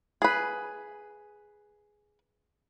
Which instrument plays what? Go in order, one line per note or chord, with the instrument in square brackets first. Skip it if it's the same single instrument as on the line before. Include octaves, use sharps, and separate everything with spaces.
[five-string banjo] G#4 B4